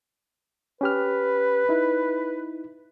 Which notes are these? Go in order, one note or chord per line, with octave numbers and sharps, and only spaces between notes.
C#4 G4 B4 F6
D#4 E4